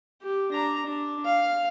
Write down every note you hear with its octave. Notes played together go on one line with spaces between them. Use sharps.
G4
D4 A#5
D4
F5